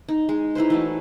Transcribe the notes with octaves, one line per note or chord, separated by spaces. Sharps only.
D#4
G#3
D#4 E4 B4 C5
E3 F#3 A3